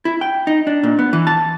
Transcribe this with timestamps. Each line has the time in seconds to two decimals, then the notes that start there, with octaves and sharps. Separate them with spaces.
0.05 E4
0.21 G5
0.47 D#4
0.67 D4
0.83 A#2
0.99 B3
1.13 E3
1.27 A5